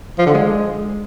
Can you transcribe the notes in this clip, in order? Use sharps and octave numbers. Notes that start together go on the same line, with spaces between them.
F3
D3
G#3